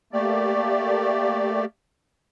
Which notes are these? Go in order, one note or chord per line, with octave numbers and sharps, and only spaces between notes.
A3 A#3 G4 D5